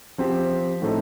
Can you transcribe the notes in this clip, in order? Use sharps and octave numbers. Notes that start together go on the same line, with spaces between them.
F3 C4 G4
A2 A3 C4 D#4